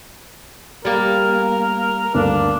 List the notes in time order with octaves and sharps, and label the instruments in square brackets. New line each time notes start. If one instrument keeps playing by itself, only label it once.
[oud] G3 A#3 [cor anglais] A#4
[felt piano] D2 G2 A#3 [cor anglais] D4